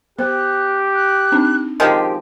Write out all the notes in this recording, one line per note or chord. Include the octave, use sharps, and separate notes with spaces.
B3 G4 C5 F#6
F#6
C4 D4 D#4
D#3 F3 G#3 G4